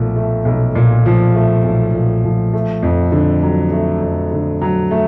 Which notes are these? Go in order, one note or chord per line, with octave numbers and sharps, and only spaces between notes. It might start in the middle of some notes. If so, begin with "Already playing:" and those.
Already playing: B1 A#2 F3 A3
A3
B1
A#2
F3
A3
B1
A#2
F3
A3
F2
D3
F#3
A3
F2
D3
F#3
A3